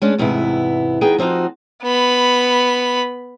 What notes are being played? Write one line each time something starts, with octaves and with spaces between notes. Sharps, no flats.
G#3 C#4 D4
E2 G#2 C3 B3 E4
E2 B3 D#4 G#4 G5
F3 C4 D#4 F4 F#4
B3 B5